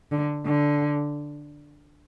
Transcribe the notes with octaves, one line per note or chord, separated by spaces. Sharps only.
D3
D3